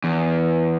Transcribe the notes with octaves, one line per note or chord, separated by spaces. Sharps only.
E2